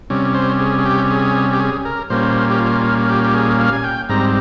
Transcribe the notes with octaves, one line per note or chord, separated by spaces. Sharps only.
C3 G3 C#4
C5
G#4
G#4
G4
G#4
G4
G#4
A#4
A#2 G3 A#3 C#4 C5
G4
F4
G4
G4
G#4
F5
G#5
G5
G#2 G3 C4 A#5